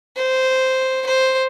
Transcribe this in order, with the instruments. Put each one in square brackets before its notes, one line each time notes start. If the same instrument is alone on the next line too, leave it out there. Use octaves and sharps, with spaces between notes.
[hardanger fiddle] C5
C5